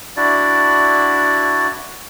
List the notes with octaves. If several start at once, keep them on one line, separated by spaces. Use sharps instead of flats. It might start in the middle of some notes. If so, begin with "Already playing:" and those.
D4 E4 F#4 D5